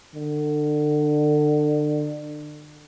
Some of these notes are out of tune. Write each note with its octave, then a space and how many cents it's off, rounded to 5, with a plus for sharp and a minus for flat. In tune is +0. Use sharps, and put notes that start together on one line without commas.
D3 +30